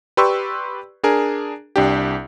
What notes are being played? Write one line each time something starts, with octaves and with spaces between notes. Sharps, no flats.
G4 B4 D5 C6 C#6 E6
D4 G#4 A#4
C2 D4 G4